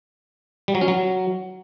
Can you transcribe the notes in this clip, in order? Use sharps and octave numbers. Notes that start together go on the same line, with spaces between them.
G3
F#3
C#4
F#3